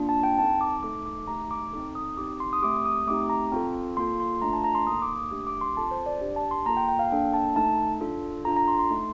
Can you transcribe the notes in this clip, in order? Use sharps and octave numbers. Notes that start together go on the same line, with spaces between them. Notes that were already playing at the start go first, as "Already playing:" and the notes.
Already playing: A#3 D4 F4
A5
G5
C4 D#4 A4 A5
D6
A3 D#4 A4 D6
D6
A3 D#4 G4 A#5
D6
C4 D#4 A4
D#6
C4 D#4 G4 D6
C6
D#6
A3 C4 G4 D6
D#6
A3 C4 D#4 G4 D6
A#5
C4 F4 A4
A#3 F4 A4 C6
C6
A3 D4 F4 A4 A#5
A5
A#5
C6
A#3 D#4 A4 D#6
D6
D#6
A3 D4 G4 D6
D6
C6
C4 F4 A4 A5
C5
D5
D4 G4
A5
C6
A#3 F4 A4 A#5
G5
G5
F5
A#3 D4 A4 G5
A5
A3 D#4 A4 A5
D4 F4 A4
D4 F4 A4 A#5
A#5
C6
C6
A3 D#4 A4